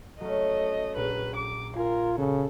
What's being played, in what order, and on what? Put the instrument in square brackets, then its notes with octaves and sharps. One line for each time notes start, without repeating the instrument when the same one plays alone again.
[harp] F#3 C#4 [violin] A3 D#5
[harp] A#1 [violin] B4
[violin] D6
[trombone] F4 [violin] A#4 [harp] G#5 G#6 C7
[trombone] C#3 [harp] F#4 [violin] A4